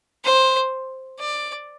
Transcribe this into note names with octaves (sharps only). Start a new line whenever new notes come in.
C5
D5